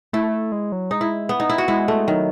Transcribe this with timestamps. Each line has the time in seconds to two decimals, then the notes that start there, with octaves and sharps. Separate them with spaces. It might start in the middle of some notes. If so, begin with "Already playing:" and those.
0.13 A3 E4
0.52 G#3
0.72 F#3
0.91 G#3 D#4
1.01 E4
1.29 B3
1.40 D#4
1.49 E4
1.58 F#4
1.68 G#3 E4
1.88 A3
2.08 D#3 F#3